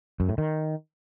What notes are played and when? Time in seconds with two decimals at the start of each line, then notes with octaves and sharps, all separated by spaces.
0.20 F#2
0.29 A2
0.38 D#3